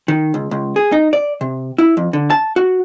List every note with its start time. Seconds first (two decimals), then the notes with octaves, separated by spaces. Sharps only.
0.08 D#3
0.34 C#2
0.51 C#2
0.76 G#4
0.92 D#4
1.13 D5
1.41 C3
1.78 E4
1.97 F2
2.13 D3
2.30 A5
2.56 F#4